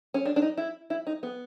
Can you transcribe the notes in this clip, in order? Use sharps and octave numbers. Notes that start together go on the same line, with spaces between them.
C#4
D4
D4
D#4
E4
E4
D#4
B3